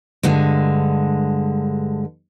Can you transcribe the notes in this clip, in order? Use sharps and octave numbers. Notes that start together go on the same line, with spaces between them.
G2 D3 G#3